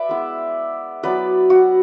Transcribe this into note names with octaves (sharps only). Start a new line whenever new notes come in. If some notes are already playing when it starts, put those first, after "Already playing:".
Already playing: B4 D5 E5
G#3 B3 E4
F#3 B3 E4 B4 D5
F#4